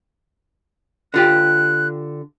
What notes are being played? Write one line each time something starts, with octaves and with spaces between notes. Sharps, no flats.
D3 F4 G4 F#6